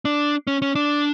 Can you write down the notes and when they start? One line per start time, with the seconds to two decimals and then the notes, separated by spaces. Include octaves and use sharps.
0.05 D4
0.47 C#4
0.62 C#4
0.75 D4